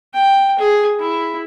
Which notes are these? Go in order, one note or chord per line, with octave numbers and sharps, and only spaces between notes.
G5
G#4
E4